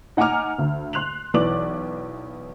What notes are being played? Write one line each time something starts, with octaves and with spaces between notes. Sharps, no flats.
D#4 F#5 G#5 A#5 D6 F6
D2
C6 F#6 F7 F#7
B1 E3 D5 D6 F#7